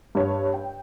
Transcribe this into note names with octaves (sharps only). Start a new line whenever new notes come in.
G2 C#5
G5